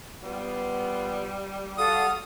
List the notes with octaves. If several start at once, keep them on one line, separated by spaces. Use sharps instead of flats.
G3 B3 F4
F#4 A4 F5 D#6